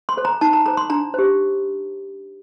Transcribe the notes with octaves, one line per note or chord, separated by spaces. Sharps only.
C6
A4 C5
A#5
D#4 A5
A#5
A4 C5 A#5
C6
D4 A#5
G4 C5